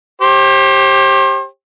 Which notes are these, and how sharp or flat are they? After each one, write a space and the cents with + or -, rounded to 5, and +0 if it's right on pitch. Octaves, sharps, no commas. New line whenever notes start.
G4 +0 C5 +40